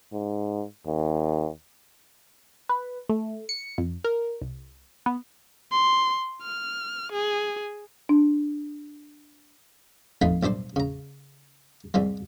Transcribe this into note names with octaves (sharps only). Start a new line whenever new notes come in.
G#2
D#2
B4
A3
C#7
F2
A#4
C2
B3
C6
F6
G#4
D4
F2 A3 D#4 F4 B5 C6
B1 G2 D4 C5 C6
C#3 A#5
C2 G#2 G3 G#3